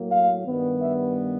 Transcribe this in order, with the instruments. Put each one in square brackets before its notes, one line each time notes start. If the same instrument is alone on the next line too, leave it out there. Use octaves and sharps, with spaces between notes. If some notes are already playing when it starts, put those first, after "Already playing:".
Already playing: [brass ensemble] A2 F#3 A#3
F5
G2 D#3 G3 B3
E5